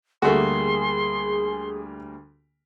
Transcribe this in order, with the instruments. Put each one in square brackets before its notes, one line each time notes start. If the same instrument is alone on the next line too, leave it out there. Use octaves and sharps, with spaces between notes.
[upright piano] D2 G3 A#3 [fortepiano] A3 F#4 [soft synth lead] G#4 [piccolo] C6